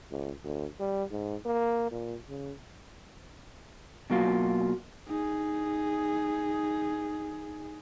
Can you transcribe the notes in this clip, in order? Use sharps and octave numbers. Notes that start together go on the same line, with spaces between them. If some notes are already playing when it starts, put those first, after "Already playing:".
C#2
D2
G3
G#2
A#3
A#2
C#3
B2 F#3 A#3 F4 F#4
D#4 G#4